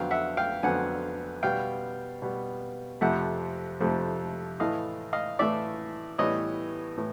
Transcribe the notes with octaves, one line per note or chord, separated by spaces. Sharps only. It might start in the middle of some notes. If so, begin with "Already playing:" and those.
Already playing: F2 D3 F#3 B3 F5 G5
E5 F#5
F5 G5
F2 D3 F#3 B3 F#5 G#5
B2 G3 B3 F5 G5
B2 G3 B3
F2 C3 F3 A3 E5 F#5
F2 C3 F3 A3
A2 E3 A3 D#5 F5
D#5 F5
A2 E3 A3 D5 E5
A2 E3 G3 B3 C#5 D#5
A2 E3